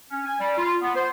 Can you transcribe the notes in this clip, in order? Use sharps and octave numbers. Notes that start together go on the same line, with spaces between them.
C#4
G#5
G3
F4
B3
C5